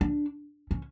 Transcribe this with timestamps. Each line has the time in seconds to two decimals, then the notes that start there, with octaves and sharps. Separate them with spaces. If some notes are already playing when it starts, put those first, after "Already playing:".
0.01 D4
0.71 C#4